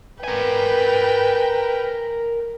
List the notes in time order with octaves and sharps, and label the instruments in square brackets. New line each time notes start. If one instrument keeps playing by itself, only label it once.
[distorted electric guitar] A#4 G#5 [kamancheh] B4 G5